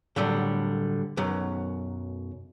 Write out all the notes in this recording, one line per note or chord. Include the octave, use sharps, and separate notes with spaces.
A2 D3 F#3 G3
B1 F#2 F#3